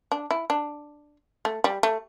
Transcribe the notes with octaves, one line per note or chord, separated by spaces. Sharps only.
D4
E4
D4
A3
G3
A3